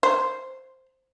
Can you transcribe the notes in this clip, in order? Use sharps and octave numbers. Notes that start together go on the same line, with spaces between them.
C5